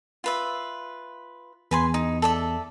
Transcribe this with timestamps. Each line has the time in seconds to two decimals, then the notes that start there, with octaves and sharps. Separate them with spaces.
0.24 F4 B4 E5
1.71 E2 B4 G#5 C6
1.94 D#4
2.22 A4 D5 E5